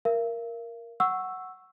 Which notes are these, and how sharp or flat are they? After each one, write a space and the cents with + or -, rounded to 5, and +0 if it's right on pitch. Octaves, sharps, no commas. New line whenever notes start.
A#4 +0 F5 -45
F#5 +0 C#6 -5 E6 +0